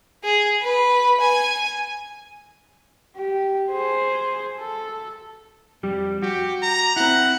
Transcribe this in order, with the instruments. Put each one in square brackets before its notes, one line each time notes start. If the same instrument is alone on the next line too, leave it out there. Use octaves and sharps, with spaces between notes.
[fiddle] G#4
B4
G#5
[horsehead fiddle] G4
G#4 C5
A4
[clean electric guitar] F2 G3 G4
[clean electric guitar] F#4 [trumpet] G4
[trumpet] A#5
[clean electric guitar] C4 E4 [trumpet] F#5